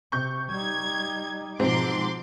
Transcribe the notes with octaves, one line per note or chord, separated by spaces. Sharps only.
C3 C#6 G6
G3 D#4 G#6
G#2 B2 F3 C4 A#5 C6 D6